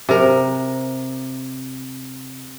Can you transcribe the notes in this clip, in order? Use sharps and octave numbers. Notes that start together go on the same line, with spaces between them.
C3 A#4